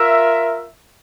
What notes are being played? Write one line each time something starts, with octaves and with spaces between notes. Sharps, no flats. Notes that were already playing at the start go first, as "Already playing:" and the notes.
Already playing: F4 A#4 E5